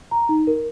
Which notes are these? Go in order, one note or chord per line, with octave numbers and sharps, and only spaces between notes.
A#5
D#4
A#4